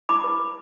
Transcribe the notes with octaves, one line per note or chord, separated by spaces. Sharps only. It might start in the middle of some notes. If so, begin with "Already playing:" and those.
E4 B5 D6
B4
B4